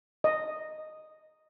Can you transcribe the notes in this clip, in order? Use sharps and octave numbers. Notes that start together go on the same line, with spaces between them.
D#5